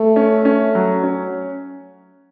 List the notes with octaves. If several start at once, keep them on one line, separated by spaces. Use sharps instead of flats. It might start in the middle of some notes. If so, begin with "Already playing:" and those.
Already playing: A3
C#4
C#4
F#3
C#4